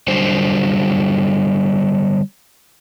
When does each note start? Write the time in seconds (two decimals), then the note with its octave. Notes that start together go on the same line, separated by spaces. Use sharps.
0.08 D3 F#3 G3 C5